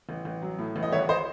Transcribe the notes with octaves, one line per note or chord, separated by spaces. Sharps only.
A1
A1
F#3
A2
A1
D#5
G#1 C#5 E5
C5 D#5